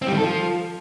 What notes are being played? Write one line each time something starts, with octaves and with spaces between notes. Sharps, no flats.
C4
G3
D#3
A4
F3